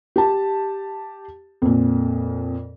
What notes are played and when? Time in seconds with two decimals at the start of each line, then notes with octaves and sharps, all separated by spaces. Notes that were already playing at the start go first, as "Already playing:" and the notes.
0.16 G4 A5
1.62 F2 A#2